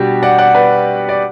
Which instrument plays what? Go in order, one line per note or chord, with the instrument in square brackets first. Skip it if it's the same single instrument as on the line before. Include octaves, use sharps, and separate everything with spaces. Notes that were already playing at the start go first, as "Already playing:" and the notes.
Already playing: [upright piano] B2 G3 D4 F#4 G4
D5 F#5
D5 F#5
B4 D5
D5